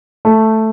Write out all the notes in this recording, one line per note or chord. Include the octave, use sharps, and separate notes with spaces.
A3